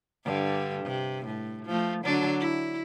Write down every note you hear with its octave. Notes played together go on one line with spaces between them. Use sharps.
G2 D3
C3
A2
F3 A3
D3 F#3 D4
E4